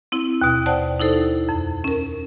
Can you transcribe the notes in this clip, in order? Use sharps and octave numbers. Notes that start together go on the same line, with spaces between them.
C4 E4
D#2 B2
C5 D5 F#5 G5 A5
D#4 E4 A4 C5
F2
C#4 A#4